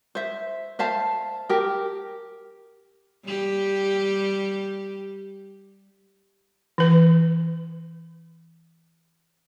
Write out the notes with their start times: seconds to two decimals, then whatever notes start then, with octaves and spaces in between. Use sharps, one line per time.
0.15 C5 E5
0.79 C5 E5 F5 A5
1.49 G4 A#4
3.25 G3 G4
6.78 E3 B4